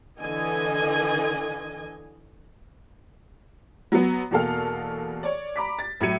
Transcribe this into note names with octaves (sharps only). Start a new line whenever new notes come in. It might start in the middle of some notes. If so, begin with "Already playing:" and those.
D3 E3 D#5 G#5
F#3 B3
E2 B2 A#3 A4 F5 F6
C#5 D5
A#5 B5 D6 B6
A6
A2 F#3 G#6 C#7 D#7